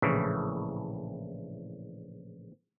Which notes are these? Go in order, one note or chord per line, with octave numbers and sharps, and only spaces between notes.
A#1 A2 C#3 E3